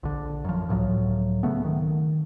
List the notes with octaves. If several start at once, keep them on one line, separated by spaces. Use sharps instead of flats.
A#1 D3
F#2 F3
C#2 A2 F3 F#3
C#3 A3 B3
D#3